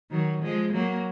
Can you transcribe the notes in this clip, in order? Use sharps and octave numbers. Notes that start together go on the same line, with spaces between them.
D#3 F#3
F3 G#3
F#3 A#3